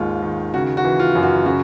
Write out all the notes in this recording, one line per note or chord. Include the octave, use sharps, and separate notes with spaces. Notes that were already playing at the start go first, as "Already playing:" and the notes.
Already playing: D#2 G#2 G#3 F4
D#3
C#3 F#4
F#4
E3
F4
F#2
F#4
C#3 F#4